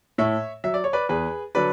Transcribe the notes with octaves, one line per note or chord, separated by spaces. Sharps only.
A2 C#5 E5
F#3 E5
D5
C#5
B4 D5
E2 G#4 B4
D3 F#3 B4 D5